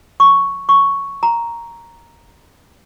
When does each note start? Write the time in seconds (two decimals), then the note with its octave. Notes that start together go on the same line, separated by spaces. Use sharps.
0.20 C#6
0.69 C#6
1.23 A#5